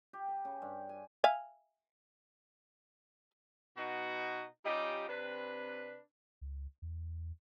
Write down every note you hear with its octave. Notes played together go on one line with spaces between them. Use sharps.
G4
B4
C#3
G2
G#5
E5 F5 G#5
B2 D#4 F#4
G3 C#4 D#4 F4 G4
C3 C4 D4 B4
C#2
E2